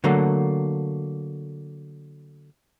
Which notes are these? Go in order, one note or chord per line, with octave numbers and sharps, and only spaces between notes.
D3 F#3 A3 A#3